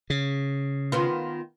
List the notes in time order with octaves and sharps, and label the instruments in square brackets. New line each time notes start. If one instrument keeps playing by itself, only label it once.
[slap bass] C#3
[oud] D#3 B3 F4